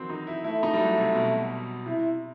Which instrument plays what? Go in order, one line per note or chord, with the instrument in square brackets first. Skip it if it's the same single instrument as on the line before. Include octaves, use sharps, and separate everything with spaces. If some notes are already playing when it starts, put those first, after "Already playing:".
Already playing: [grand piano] D#3 E3 F#3 C4
D#4
E4
[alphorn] A3 [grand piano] E4
[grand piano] D#4
G3
F#3
C3
B2
[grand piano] C3 [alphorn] E4